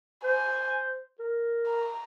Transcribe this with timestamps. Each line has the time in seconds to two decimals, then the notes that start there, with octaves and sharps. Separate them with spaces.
0.24 C5 G#5
1.19 A#4
1.68 A#5